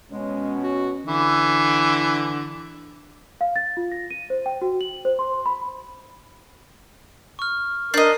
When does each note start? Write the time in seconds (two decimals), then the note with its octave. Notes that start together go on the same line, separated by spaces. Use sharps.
0.11 B2 G#3 C#4
0.63 F#4
1.06 D3 E3
3.41 F5
3.56 A6
3.77 F4
3.92 A#6
4.11 D#7
4.30 C5
4.46 G5
4.62 F#4
4.81 F#7
5.05 C5
5.19 C6
5.46 B5
7.39 C#6 F6
7.94 D4 A#4 D#5 G6 C7